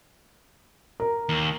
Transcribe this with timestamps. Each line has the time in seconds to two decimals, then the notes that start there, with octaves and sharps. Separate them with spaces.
1.00 A#4
1.29 D#2